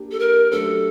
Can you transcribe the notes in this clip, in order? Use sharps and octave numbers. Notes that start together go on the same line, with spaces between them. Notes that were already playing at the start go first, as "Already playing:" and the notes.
Already playing: A#3 D4 G4
A4
A#4
F#3 A3 D4 G4 A4 C5